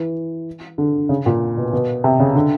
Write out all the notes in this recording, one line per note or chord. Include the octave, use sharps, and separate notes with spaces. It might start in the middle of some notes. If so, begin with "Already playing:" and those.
Already playing: E3
D3
C#3
A#2
B2
B2
C3
C#3
D3